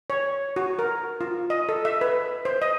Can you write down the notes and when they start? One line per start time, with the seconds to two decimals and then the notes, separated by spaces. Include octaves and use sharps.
0.10 C#5
0.56 F#4
0.79 A#4
1.21 F4
1.50 D#5
1.69 A4
1.85 E5
2.01 B4
2.45 C5
2.62 D#5